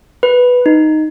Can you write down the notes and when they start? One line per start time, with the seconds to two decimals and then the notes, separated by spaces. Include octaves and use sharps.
0.23 B4
0.66 D#4